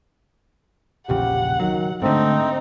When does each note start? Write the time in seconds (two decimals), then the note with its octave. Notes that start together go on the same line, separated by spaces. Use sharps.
1.09 E1 A#1 C#3 G4 F#5
1.60 D#3 F#3
2.02 G#2 D3 A3 C4 D#4